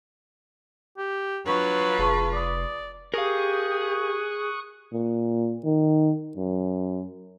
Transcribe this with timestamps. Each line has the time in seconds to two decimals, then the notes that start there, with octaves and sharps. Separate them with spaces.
0.98 G4
1.46 F#3 D4 F4 B4 C#6
1.99 F1 G#4 A5 C#6
2.33 D5 D6 D#6
3.14 G4 G#4 A#4 F5 C#6 D#6 F#6
4.93 A#2
5.65 D#3
6.36 F#2